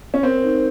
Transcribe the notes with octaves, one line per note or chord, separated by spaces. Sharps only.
C#4
C4 A#4
D#4